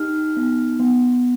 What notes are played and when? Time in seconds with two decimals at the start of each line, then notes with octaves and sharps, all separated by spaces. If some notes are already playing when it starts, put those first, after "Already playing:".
Already playing: D#4 G4 F6
0.37 B3
0.79 B3